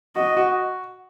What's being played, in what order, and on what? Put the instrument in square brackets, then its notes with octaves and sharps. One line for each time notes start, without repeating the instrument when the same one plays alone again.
[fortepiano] F#4 [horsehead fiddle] D#5
[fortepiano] F#4